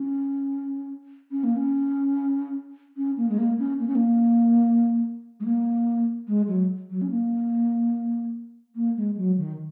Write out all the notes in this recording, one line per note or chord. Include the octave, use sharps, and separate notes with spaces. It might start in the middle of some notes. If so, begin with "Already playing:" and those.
Already playing: C#4
C#4
A#3
C#4
C#4
A#3
G#3
A#3
C#4
A#3
C#4
A#3
G#3
A#3
G#3
F#3
F#3
C#4
A#3
A#3
G#3
F#3
D#3